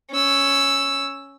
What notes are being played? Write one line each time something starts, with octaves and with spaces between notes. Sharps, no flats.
C#4 E6